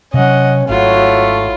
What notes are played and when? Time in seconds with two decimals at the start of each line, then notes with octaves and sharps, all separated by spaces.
0.14 C3 F#3 C#4 D#5 F#5
0.69 G#1 F#3 A3 E4 F4